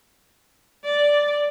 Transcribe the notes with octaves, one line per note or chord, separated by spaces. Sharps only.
D5